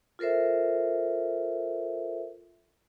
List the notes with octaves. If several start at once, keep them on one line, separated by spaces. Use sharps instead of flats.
F4 A4 A#4 C5 E5